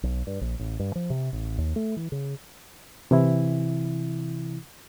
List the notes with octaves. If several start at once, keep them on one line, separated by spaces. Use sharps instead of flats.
B1
G2
A#1
A1
G2
F3
C3
A1
D#2
A3
E3
C#3
C3 E3 E4